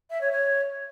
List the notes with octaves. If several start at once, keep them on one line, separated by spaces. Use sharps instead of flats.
E5
C#5
C#5